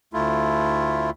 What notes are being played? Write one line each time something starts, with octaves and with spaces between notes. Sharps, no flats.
D2 A3 E4 F4